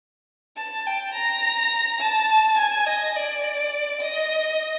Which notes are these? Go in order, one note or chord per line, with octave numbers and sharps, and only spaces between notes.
A5
G5
A#5
A5
G#5
D#5
D5
D#5